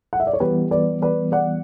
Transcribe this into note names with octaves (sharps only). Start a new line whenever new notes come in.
F#5
E5
D5
C#5
E3 G3 B3 G4 B4
B4 D5
B4 D5
D5 F#5